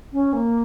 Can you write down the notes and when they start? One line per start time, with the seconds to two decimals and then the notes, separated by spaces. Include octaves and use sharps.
0.12 C#4
0.33 A#3